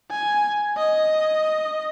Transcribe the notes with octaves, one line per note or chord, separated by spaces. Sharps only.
G#5
D#5